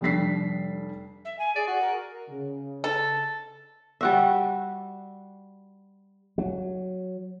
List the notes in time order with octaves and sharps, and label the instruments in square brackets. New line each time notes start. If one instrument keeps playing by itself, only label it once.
[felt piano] F1 G3 D4 B6 C7
[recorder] E5
G#5
[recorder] G#4 [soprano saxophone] D5
[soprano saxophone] F#4
[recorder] A#4
[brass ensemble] C#3
[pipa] A4
[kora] G3 F#4 E5
[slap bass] F#3